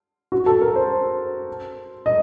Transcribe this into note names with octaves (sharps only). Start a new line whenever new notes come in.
F#4
A4
A#4
C5
D#5